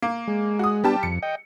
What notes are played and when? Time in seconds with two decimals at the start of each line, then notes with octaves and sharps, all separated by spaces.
0.02 A#3
0.28 G#3
0.59 F#4 D#6
0.84 G3 B3 D4 G4 A5
1.03 F2 C#7
1.22 D#5 G5